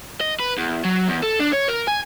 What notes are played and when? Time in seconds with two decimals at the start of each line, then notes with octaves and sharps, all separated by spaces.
0.21 D#5
0.40 B4
0.58 E2
0.85 F#3
1.09 E2
1.23 A4
1.40 D4
1.53 C#5
1.69 A#4
1.88 G#5